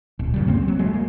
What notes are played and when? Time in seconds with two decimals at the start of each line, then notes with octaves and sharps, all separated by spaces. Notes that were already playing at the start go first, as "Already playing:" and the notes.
0.19 D1
0.34 F#2 C#3 G3
0.47 A#3 C4 C#4
0.68 F#3
0.79 F#3 G#3 A3
0.94 A#3